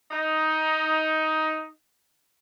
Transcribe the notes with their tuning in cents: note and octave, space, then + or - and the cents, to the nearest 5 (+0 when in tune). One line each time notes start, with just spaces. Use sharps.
D#4 +10